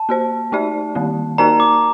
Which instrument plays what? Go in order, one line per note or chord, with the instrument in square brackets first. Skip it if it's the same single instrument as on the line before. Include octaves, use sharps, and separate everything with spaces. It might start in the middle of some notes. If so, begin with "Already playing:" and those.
Already playing: [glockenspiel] A5
[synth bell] A#3 F#4 C5
A3 D#4 G4 D5
D#3 G3 A#3
[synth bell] A#3 D#4 F#4 A#4 D5 [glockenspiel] A#5
[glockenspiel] D6